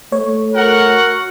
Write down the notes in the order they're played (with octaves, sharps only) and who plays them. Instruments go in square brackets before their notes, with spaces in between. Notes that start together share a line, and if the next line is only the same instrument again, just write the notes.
[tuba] A3 [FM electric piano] C#5
[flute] F#4 [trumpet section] A#4 F#5